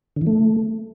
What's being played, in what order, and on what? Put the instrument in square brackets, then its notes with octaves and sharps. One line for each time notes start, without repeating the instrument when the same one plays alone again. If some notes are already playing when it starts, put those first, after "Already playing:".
[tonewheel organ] D3
E3
A3